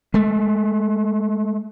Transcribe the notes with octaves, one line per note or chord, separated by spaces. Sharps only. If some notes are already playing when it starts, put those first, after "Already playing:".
G#3 A3